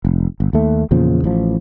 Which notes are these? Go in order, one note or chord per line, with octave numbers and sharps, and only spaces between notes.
F1
G1
D#2 A3
E2 A#2 C#3 F3
A1 F3